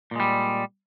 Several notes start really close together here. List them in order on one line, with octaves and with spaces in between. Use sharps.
A#2 G#3 G3